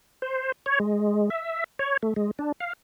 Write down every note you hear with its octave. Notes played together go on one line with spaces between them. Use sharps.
C5
C#5
G#3
E5
C#5
A3
G#3
D4
F5